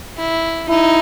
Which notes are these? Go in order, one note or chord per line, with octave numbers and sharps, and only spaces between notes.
E4
D#4 E4